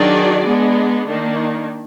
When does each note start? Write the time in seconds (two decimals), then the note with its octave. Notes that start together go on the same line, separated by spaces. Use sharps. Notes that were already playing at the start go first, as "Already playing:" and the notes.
Already playing: D#3 F#3 D4 G#4 D5
0.46 G#3 B3 D4
1.06 D#3 A#3 D4